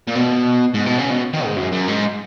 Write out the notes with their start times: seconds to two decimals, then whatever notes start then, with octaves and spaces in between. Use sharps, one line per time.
0.08 A#2
0.16 B2
0.74 G#2
0.86 B2
0.98 C#3
1.10 B2
1.33 D#3
1.45 G#2
1.57 F#2
1.72 F#2
1.88 G#2